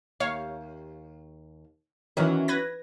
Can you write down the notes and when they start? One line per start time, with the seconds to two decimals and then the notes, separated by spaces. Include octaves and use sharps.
0.20 D#2 C#5 F5
2.17 E2 D#3 E3 F#3 C#4
2.48 B4 G#6 A#6